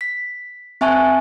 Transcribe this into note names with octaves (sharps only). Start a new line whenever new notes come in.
B6
C4 E5 G#5 A5 C#6 F#6